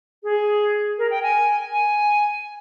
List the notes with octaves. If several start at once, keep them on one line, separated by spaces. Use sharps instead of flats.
G#4
A#4
G5
G#5
G#5